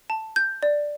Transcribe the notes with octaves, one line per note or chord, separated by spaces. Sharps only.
A5
G6
D5